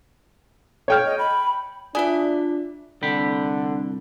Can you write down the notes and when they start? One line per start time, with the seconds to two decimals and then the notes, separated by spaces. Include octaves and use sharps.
0.88 C#5 G5 F6
1.05 D#5
1.19 B5
1.95 D4 F4 G#4 D5 E5
3.02 C2 D3 G5 B5